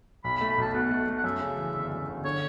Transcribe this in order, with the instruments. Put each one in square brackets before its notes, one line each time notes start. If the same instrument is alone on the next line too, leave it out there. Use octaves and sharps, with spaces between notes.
[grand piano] B1 [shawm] B5
[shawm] B5
[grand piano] A3
[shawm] B5
[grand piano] B1 [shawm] A5
[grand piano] B2 [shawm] F#5
[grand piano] A3
A3
[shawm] F#5
[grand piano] F#2 [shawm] E5
[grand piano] C#3
E3
G1
F#2
G1
[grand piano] D3 [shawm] C#5